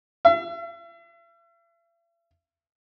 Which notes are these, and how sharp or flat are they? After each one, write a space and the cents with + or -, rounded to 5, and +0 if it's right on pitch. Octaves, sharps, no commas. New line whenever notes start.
E5 +40